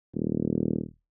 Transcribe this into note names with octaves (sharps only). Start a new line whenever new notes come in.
D#1